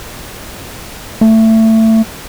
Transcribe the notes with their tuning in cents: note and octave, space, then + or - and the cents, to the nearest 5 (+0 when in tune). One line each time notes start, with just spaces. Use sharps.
A3 +20